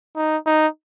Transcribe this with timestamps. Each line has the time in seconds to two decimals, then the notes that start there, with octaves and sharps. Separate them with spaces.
0.16 D#4
0.46 D#4